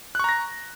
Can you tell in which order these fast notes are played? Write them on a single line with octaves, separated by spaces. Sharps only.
F#6 C#6 A#5 A#6